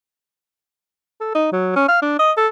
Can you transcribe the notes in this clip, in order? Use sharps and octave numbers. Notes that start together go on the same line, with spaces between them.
A4
D#4
F#3
C#4
F5
D4
D#5
A4